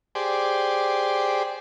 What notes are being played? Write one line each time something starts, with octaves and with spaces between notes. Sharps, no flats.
G4 G#4 C5 D5